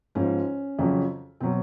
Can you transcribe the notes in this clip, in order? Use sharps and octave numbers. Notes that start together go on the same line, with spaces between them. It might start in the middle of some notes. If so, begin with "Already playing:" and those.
G#2 F3 C#4
F2 C#3 F#3
B2 F#3 C4